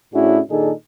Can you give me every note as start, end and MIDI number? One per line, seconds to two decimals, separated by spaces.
0.13 0.39 45
0.13 0.39 61
0.13 0.39 62
0.13 0.39 64
0.13 0.39 66
0.13 0.39 68
0.49 0.72 46
0.49 0.72 51
0.49 0.72 62
0.49 0.72 63
0.49 0.72 68
0.49 0.72 69